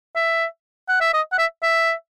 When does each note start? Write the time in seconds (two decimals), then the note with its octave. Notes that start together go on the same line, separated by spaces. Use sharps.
0.16 E5
0.89 F#5
1.01 E5
1.14 D#5
1.32 F#5
1.38 E5
1.63 E5